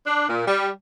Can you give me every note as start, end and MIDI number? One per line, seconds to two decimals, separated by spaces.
0.07 0.29 62
0.29 0.45 46
0.47 0.70 55